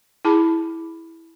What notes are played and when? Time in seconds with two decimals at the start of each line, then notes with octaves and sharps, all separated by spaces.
0.25 E4 G#4 A5 B5